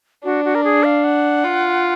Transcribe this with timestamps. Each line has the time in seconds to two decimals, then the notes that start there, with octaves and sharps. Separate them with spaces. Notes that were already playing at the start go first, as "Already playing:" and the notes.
0.24 D4 F#4
0.45 F#4
0.55 A#4
0.64 G#4
0.84 F5
1.04 F#5
1.44 F4